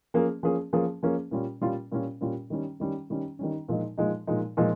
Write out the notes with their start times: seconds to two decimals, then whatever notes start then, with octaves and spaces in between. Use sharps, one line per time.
0.14 F3 A#3 C#4 G#4
0.43 F3 A#3 C#4 G#4
0.73 F3 A#3 C#4 G#4
1.03 F3 A#3 C#4 G#4
1.31 A#2 G3 C#4 F4
1.61 A#2 G3 C#4 F4
1.92 A#2 G3 C#4 F4
2.21 A#2 G3 C#4 F4
2.50 D#3 G3 C#4
2.80 D#3 G3 C#4
3.10 D#3 G3 C#4
3.39 D#3 G3 C#4
3.69 A#2 F3 G#3 D#4
3.98 A#2 F3 G#3 D#4
4.27 A#2 F3 G#3 D#4
4.57 A#2 F3 G#3 D#4